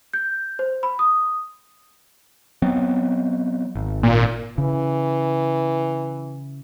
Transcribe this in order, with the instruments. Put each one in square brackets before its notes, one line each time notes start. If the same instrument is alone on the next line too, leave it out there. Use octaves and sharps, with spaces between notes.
[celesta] G6
C5
B5
D#6
[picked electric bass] F#3 B3 C4
G#1
[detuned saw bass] A#2
[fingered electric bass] C#3 [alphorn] E3